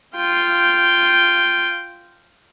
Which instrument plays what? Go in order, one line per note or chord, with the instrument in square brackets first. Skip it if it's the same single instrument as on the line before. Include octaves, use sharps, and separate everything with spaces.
[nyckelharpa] F4 G5